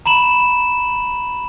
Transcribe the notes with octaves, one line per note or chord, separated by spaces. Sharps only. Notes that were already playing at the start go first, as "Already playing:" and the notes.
A#5 B5 E7 F#7